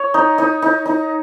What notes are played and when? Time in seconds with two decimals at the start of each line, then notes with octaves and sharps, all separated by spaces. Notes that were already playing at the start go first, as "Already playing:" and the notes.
Already playing: C#5
0.14 D#4
0.38 D#4
0.62 D#4
0.86 D#4